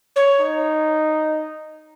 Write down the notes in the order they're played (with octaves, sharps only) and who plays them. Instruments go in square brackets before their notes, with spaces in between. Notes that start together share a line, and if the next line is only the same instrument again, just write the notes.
[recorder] C#5
[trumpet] D#4